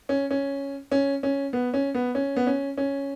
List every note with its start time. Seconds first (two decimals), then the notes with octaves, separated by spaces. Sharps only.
0.09 C#4
0.31 C#4
0.92 C#4
1.23 C#4
1.53 B3
1.74 C#4
1.94 B3
2.15 C#4
2.36 B3
2.47 C#4
2.77 C#4